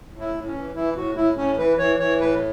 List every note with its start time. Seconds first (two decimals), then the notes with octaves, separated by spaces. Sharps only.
0.13 A2
0.20 E4
0.34 A2
0.47 C#4
0.55 E3
0.75 E3 E4
0.96 A2 F#4
1.16 A2 E4
1.37 A2 C#4
1.58 E3 B4
1.78 E3 C#5
1.99 E3 C#5
2.20 A2 B4